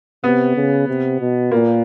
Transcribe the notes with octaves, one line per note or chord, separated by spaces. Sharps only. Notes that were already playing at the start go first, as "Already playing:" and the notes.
C3 B3
C#3
C3
B2
A#2 A#3